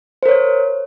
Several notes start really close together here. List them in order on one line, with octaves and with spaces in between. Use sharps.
C5 A#4 C#5